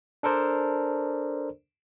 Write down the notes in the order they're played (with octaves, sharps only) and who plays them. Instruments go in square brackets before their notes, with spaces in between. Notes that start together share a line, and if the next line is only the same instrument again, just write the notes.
[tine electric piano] D4 A4 A#4 C5 D5